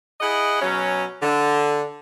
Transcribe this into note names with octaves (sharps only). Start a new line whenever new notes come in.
E4 G#4 D#5 F#5
B2 F#3 C#4
D3